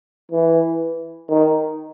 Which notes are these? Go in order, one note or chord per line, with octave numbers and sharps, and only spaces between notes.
E3
D#3